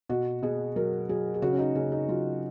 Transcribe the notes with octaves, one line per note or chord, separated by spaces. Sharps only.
B2 F#4
B2 G#4
F#3 A#4
F#3 G#4
G#4
C#3 F#4
C#4
D#4
C#3 C#4
D#4
F#3 F4